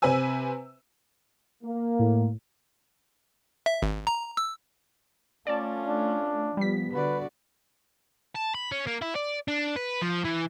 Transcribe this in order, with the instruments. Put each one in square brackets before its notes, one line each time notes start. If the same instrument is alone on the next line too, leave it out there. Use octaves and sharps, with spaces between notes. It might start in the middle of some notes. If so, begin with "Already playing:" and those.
[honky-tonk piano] C3 B4 C5 G#5 E6
[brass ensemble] A#3
[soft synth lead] A2
[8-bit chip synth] E5
G#1
A#5
E6
[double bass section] A3 [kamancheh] C#4 F4 [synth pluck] D5 A5
[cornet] D4
[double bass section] F3 B3 [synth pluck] G3 B6
[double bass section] D3 [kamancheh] F#4 D5 [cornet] B4
[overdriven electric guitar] A5
B5
C#4
A#3
E4
D5
D4
B4
F3
E3